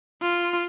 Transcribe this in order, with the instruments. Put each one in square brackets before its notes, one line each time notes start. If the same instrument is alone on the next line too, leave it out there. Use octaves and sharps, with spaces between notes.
[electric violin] F4